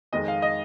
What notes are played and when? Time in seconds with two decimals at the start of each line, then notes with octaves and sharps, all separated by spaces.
0.13 F2 D#3 G#3 D#5
0.28 F5
0.42 D#5